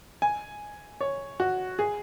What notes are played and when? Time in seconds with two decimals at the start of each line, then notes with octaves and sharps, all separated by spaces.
0.22 G#5
1.01 C#5
1.40 F#4
1.79 G#4